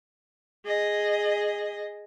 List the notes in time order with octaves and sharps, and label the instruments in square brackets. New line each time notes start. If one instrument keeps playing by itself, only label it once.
[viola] G#4 D#5